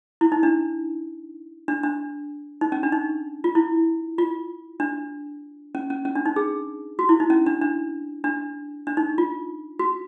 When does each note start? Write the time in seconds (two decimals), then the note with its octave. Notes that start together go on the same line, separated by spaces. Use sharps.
0.21 E4
0.32 D#4
0.43 D4
1.68 D4
1.83 D4
2.61 D#4
2.72 C#4
2.83 D4
2.92 D#4
3.44 F4
3.55 E4
4.18 F4
4.80 D4
5.75 C#4
5.90 C#4
6.05 C#4
6.15 D4
6.26 D#4
6.36 G#4
6.99 F#4
7.09 E4
7.20 D#4
7.30 C#4
7.46 D4
7.62 D4
8.24 D4
8.87 D4
8.97 D#4
9.18 F4
9.79 F#4